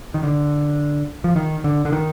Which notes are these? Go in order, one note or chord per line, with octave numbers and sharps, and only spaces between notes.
D#3
D3
F3
D#3
D3
D3
D#3